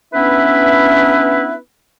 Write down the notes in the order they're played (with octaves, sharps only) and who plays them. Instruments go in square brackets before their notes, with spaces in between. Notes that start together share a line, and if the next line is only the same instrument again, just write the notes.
[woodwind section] B3 C#4 D4 E4 B4 E5